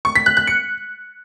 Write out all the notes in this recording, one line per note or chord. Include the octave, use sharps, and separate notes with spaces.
C#6
B6
F#6
F#6
C#7